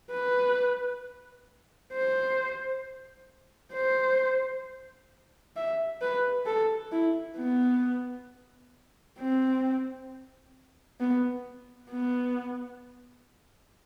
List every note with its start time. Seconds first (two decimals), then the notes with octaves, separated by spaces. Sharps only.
0.12 B4
1.93 C5
3.74 C5
5.56 E5
6.01 B4
6.46 A4
6.92 E4
7.38 B3
9.19 C4
11.00 B3
11.91 B3